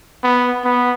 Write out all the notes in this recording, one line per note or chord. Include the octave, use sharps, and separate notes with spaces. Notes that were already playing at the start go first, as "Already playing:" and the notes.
B3
B3